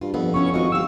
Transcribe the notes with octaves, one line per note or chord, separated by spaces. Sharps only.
G2 F4
F2 B3
B3 C#4 E4 C#6
G#1 F4 F#4 D#5
G1 G4 F5 E6